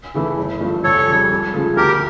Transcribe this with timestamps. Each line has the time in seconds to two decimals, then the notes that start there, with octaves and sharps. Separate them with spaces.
0.14 C#3 E3 A3 E4
0.37 G1
0.61 G2 F3 A3
0.84 F1 A4 C#5
1.07 F2 C#3 G3
1.30 C#2
1.54 C#3 F3 A3
1.77 D2 G4 A#4